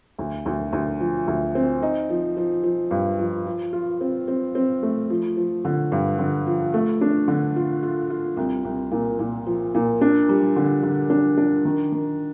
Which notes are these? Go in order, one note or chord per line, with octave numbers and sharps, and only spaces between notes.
D2
D2
D2
F3
D2
C4
D#4
F3
F3
F3
G2
F3
F3
F4
C4
C4
C4
A3
F3
F3
D3
G2
D3
F3
A3
D4
D3
F4
F4
F4
C2
C2
A#2
A#2
F3
A#2
D4
G3
D3
D3
D4
D4
D#3
D#3